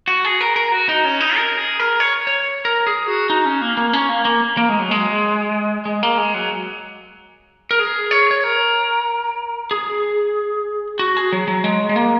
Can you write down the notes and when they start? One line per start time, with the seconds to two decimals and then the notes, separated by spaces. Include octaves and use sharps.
0.08 F#4
0.25 G#4
0.41 A#4
0.56 A#4
0.72 F#4
0.89 D#4
1.05 C#4
1.20 D#4
1.36 A#4
1.57 G#4
1.80 A#4
2.00 C#5
2.27 C#5
2.65 A#4
2.87 G#4
3.07 F#4
3.30 D#4
3.45 C#4
3.61 A#3
3.77 A#3
3.93 C#4
4.09 A#3
4.25 A#3
4.57 A#3
4.69 G#3
4.79 F#3
4.91 G#3
5.85 G#3
6.03 A#3
6.18 G#3
6.34 F#3
7.71 A#4
7.79 G#4
8.11 C#5
8.31 C#5
8.44 A#4
9.71 G#4
10.99 F#4
11.17 G#4
11.33 F#3
11.48 F#3
11.64 G#3
11.89 G#3
11.96 A#3